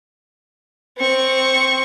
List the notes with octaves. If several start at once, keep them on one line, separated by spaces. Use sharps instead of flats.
C4 C#6